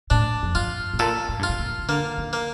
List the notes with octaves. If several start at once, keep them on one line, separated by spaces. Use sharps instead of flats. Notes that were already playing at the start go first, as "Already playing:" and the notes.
A2 D4
F2
G2 F4
A2
A#2 A4
A2
G2 F4
A2
A#2
D#3
D3 A#3
D#3
A#3